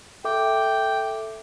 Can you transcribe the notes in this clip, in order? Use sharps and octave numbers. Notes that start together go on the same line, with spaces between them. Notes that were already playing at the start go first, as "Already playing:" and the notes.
A4 E5 G5 D6